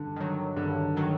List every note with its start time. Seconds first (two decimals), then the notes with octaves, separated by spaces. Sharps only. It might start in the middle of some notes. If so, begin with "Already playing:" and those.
Already playing: G2 D3
0.16 D#3 F#3
0.56 G2 D3
0.96 D#3 F#3